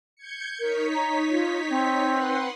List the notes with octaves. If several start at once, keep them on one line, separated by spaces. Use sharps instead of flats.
G6 G#6 C#7
D#4 A#4 C#5 B6
A#5
F4
C4
B4 F#5 C6